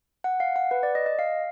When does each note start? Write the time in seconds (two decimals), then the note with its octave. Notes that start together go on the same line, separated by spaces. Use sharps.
0.24 F#5
0.40 F5
0.56 F#5
0.71 B4
0.83 D5
0.95 D#5
1.06 D#5
1.19 F5